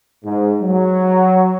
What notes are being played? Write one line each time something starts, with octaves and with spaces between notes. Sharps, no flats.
G#2
F#3